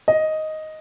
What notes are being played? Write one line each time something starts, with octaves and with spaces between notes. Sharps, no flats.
D#5